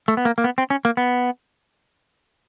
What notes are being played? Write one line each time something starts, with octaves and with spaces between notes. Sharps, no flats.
A3
B3
A#3
A#3
B3
C4
C#4
A#3
B3